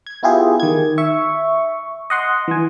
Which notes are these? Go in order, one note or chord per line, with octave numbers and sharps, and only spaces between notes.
G#6
B3 E4 F4 G4 G#4
D#3 G#6
E5 C#6
D#5 F#5 C6
E3 G#5